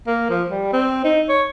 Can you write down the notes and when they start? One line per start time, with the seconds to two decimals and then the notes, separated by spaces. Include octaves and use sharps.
0.07 A#3
0.29 F3
0.50 G3
0.73 C4
1.04 D#4
1.29 C#5